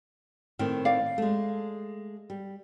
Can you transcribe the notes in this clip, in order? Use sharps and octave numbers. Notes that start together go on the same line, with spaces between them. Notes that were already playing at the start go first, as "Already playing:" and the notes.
A2 D#3 C4
D5 F5
G#3 A3
G3